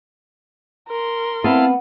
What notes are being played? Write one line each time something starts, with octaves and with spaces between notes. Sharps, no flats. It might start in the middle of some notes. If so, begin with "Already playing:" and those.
A#4 C6
B3 C4 E4 F5 A5